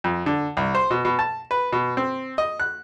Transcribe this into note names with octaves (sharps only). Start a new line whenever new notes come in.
F2
D3
C2
C5
B2
B2
A5
B4
B2
C4
D#5
F#6